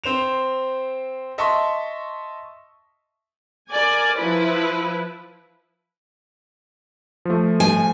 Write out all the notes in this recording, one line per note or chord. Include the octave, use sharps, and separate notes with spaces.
C4 C5 E7 F7
D#5 E5 A5 C6 C#6
A#4 D5 G#5
F3 E4 B4
F3 A3
G#5